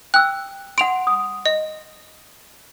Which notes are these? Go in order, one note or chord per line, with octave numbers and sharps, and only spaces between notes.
G5 E6 F#6
F#5 C6 D7 F7
D#6
D#5